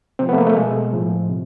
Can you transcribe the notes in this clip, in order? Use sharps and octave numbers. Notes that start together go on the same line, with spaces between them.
C3 F3 C4
B3
A3
A#3
A3
B2 G#3
A2 F3
C3